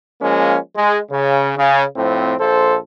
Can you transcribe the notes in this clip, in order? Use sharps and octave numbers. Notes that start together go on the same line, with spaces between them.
F3 G#3 A#3 C#4
G#3
C#3
C#3
F2 A2 C4
A#1 A4 C5